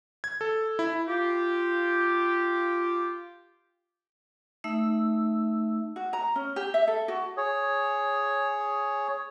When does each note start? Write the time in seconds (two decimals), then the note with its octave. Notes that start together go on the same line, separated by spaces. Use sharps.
0.24 G#6
0.41 A4
0.79 E4
1.08 F4 G4
4.64 A3 D#4 E5 E6
5.96 F#4
6.13 A#5
6.36 C#4
6.56 G4
6.74 E5
6.87 A4
7.08 F#4
7.37 G#4 C#5